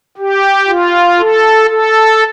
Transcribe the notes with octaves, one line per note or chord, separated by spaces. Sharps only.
G4
F4
A4
A4